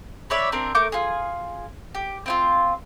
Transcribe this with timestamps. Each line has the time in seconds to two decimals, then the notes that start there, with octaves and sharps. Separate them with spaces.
0.30 B4 C#5 D5 E5
0.52 C4 D4 A#4
0.75 A3 A#4 D6 G6
0.92 F4 G#4
1.95 G4
2.26 C4 E4 F4